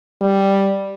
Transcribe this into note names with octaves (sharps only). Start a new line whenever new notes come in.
G3